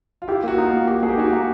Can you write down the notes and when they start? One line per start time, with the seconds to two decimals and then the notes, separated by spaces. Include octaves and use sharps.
0.22 F4
0.28 E4 G4
0.44 A#3 F#4
0.58 D#4 F4
0.73 A#3
0.87 F#4 G4
1.03 A#3 G#4
1.08 G4
1.18 D#4 F#4
1.27 G4
1.33 A#3